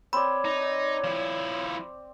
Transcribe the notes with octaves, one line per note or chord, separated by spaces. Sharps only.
C4 C#5 D5 B5
D#4
F3 E4